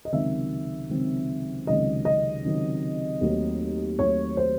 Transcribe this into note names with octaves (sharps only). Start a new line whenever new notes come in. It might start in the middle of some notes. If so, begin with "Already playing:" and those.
D#5
C#2 C3 D#3 F#3 C4 E5
C#2 C3 D#3 F#3 C4
C#2 C3 D#3 F#3 C4 D#5
D#5
C#2 C3 D#3 F#3 C4
D#2 D#3 F#3 A3 C4
D#2 D#3 F#3 A3 C4 C#5
C5